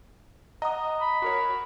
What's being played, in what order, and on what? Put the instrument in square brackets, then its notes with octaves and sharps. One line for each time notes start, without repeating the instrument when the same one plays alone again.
[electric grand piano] D#5 F#5 [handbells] A#5 D#6
[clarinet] B5
[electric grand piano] F#4 A#4 C#5